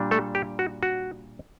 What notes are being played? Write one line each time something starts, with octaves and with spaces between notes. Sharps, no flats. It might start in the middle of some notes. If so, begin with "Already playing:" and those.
Already playing: A#2 G3 D4
A3 A4
G4
F#4
F#4